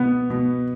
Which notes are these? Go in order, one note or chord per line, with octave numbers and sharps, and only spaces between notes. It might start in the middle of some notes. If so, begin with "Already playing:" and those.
Already playing: B2 B3
B2